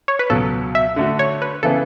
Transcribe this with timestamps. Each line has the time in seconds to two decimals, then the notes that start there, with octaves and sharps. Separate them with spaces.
0.08 C#5
0.19 B4
0.30 C#2 B2 F#3 A4
0.75 E5
0.96 D3 A3 D4 F#4
1.19 C#5
1.42 B4
1.63 C#3 E3 B3 A4